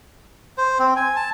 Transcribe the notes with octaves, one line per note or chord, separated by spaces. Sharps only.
C5
C4
G#5
A5